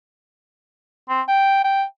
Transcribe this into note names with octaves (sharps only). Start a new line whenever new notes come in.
C4
G5
G5